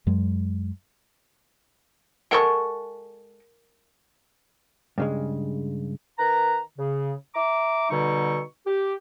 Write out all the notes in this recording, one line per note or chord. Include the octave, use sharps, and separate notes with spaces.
F#2 F#3 G#3
G#3 A4 A#4 F#5 C#6 D7
G2 C#3 G#3
D#3 B4 A#5
C#3
E5 A#5 D6
B2 D3 G3 D#4 C#6
G4